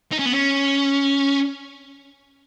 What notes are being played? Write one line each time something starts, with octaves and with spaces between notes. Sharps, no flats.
D#4
C#4
B3
C#4